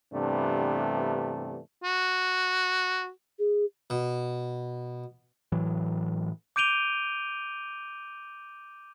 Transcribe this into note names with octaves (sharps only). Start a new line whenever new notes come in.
G2 C3 E3 A3 B3 D4
F#4
G#4
B2
A2 E3 F#3
D6 G6 D7 D#7 F7 G7